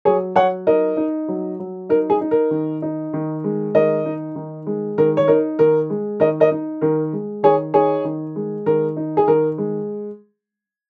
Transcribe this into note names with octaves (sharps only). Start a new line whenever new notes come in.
F#3 G#4 C#5
F#3 C#5 F#5
D#4 A#4 D#5
D#4
F#3
F#3
D#4 A#4
G#4
D#4
A#4
D#3
D#4
D#3
G#3
D#3 A#4 D#5
D#4
D#3
G#3
D#3 A#4
C#5
D#4 A#4
D#3 A#4
G#3
D#3 A#4 D#5
A#4 D#5
D#4
D#3 A#4
G#3
D#3 G#4 C#5
D#4 G#4 C#5
D#3
G#3
D#3 A#4
D#4
G#4
D#3 A#4
G#3